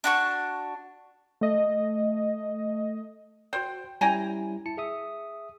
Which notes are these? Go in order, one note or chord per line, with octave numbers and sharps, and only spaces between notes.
D4 F#4 C#6
A3 D#5
F#4 C5 G5
G3 C#4 E4 G5 G#5 A#5
E4 A5 C#7
G#4 E5 D#6